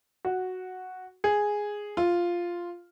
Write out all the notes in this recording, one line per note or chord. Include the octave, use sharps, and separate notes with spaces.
F#4
G#4
F4